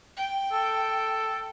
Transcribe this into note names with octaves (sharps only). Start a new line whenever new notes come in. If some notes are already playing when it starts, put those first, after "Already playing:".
G5
A4